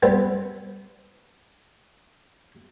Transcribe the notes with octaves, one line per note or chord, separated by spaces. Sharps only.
G3 B3 C4 B4